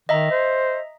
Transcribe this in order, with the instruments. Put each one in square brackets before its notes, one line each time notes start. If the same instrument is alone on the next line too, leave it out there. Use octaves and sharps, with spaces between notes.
[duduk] D#3 [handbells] D#5 E5 A#5
[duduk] C5